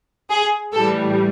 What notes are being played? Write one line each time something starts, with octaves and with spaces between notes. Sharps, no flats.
G#4
A2 E3 G3 A4